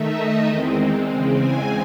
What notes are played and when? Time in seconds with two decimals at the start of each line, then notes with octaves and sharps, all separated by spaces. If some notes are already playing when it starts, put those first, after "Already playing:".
Already playing: D#3 A3 D#4 E5
0.16 D#5
0.46 E2 D#3 G#3 C4
1.07 E2 C#3 G#3 C4
1.37 G#5